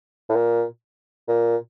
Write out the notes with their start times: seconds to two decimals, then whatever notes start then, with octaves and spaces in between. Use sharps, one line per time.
0.29 A2
0.36 A#2
1.28 A#2